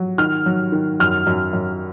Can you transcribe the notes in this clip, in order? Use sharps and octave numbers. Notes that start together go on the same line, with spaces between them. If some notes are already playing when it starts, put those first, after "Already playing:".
Already playing: F#3
D#3 F6
F#3
D#3
F#2 F6
F#2
F#2